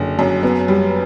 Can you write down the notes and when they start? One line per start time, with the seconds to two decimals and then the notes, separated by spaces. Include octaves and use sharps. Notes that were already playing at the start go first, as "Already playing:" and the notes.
Already playing: F#1 D3
0.19 F#2
0.43 B3
0.68 G3